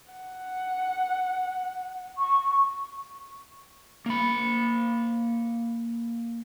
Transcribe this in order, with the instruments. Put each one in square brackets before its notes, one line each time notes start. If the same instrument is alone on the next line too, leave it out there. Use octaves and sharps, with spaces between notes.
[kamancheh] F#5
[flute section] C#6
[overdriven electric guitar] A#3 B5